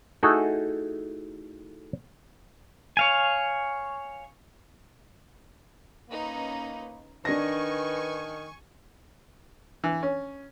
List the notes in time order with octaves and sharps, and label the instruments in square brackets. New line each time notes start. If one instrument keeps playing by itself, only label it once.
[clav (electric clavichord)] A3 D#4 E4 F#4 G#4 A4
[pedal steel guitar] C#5 F5 G#5
[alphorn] A#3 [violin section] C#4 D#4 B4
[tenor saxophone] D#3 [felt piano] D4 A#6 [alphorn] B4 [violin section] G#5 C#6
[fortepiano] E3
C#4